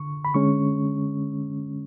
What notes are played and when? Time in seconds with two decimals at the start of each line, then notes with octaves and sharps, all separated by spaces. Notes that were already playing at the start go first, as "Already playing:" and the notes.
Already playing: D3 C#6
0.25 B5
0.34 D3 G#3 C#4 C#6